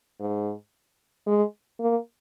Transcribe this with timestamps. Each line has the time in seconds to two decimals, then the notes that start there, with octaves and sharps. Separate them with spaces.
0.20 G#2
1.27 G#3
1.80 A#3